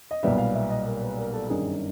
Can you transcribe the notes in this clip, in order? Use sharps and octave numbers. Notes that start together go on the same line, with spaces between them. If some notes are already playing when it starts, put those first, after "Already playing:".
D#5
B1 A#2 G3 B3 E5
F5
E5
D#5
A#4
B4
A#4
A4
G1 F#2 D#3 G3 G#4